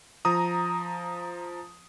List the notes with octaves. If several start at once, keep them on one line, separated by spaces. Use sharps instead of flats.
F3 A#5 D#6